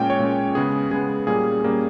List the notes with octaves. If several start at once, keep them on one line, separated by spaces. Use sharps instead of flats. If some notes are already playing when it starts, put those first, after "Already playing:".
Already playing: A#2 G#3 C#4 G5
C#5
A#2 G#3 C#4
C#3 G#3 B3 G#4
C#3 G#3 B3 G#4
A#2 G3 A#3 C#4 G#4
A#2 G3 A#3 C#4